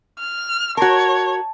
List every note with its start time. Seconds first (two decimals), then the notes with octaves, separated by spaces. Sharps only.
0.19 F6
0.77 F#4 A#4 C#5 A5